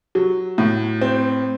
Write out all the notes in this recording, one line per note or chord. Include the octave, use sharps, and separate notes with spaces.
F#3
A2
C4